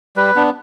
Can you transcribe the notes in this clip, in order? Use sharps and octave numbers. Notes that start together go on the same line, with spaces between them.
G3 B4
B3 D4